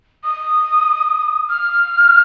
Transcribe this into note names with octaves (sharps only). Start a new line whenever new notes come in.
D#6
F6